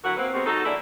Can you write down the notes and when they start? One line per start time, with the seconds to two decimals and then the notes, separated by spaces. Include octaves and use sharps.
0.04 D2 F#3 E4 F#4 A#4 F#5
0.17 A#3 C4 B4
0.34 G#3 B3 C4 F#4 G4 A#4
0.46 F#3 D#4 F#4 A4
0.65 E3 A#3 D4 E4 G#4